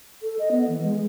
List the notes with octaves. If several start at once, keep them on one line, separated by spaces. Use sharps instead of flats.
A4
D#5
B3
E3
G#3